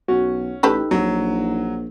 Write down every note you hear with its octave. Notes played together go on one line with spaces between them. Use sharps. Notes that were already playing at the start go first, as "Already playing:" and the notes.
B1 C#4 F#4
A1 D#4 G4 A4 B4
A#1 F#3